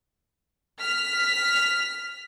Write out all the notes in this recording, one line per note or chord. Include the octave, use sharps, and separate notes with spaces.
F6 B6